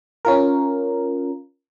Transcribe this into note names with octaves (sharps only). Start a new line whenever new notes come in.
C#4 F4 A#4